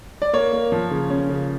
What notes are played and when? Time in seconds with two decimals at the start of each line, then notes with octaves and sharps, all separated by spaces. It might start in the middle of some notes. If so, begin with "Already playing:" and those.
0.22 D5
0.33 A#3 C#5
0.52 A#3
0.72 F3
0.91 C#3
1.10 C#4
1.29 C#3